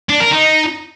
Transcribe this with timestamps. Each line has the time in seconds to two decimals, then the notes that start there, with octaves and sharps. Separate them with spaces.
0.09 D4
0.20 A#4
0.31 D#4